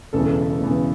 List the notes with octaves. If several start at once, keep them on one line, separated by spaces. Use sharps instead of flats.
E1 E2 C#3 A4
E1 E2 C#3